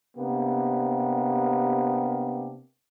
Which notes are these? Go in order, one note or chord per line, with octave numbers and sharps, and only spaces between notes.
C3 A#3 B3 D4 G4